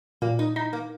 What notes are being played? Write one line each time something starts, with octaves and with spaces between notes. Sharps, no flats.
A#2 A#3
D#4
D#4 E4
A#3